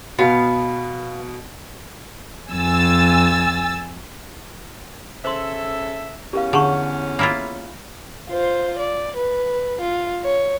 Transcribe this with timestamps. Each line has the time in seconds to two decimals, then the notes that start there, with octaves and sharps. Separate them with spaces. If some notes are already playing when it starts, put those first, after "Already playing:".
0.19 B2 B3 F5
2.51 F2 G#5 E6 A6
5.25 C#3 A4 C5 E5 C6
6.33 E2 C#4 G4 A#4 F5
6.53 D3 G#4 C#5 C#6
7.19 A#3 E4 F4 B5 E6
8.29 F4 C5
8.79 D5
9.17 B4
9.81 F4
10.23 C#5